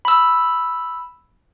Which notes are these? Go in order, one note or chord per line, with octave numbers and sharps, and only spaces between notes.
B5 E6